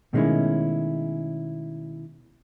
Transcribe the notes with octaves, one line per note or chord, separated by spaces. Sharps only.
B2 D#3 G#3 A3 C#4 E4